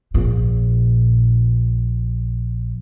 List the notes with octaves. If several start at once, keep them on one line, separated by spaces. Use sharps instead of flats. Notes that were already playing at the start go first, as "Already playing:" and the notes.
A#1 A#2